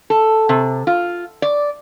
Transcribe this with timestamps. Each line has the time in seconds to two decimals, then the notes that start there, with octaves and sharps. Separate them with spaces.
0.10 A4
0.49 C3
0.87 F4
1.42 D5